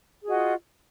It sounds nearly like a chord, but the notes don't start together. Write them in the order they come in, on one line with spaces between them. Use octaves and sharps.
G#4 F#4 D#5 F4